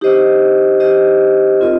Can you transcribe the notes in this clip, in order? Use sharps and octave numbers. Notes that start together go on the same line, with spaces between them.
D#4 G4 C5 D#5
D#4 G4 C5 D#5
C4 F4 A#4 D#5